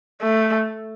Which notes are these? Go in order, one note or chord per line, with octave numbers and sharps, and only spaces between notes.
A3